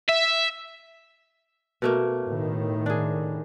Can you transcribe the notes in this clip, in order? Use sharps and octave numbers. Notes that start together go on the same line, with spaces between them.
E5
B2 A3 A#3
A2 D#3
D4 G#4